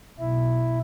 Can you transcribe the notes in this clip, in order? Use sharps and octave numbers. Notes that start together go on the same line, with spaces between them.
B1 E4